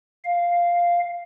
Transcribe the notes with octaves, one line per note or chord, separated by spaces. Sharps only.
F5